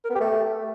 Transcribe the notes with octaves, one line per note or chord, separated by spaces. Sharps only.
A#4
B3
G4
A3